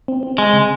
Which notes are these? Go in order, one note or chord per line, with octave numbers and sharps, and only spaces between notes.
C4
C4
G#3 C4
C#3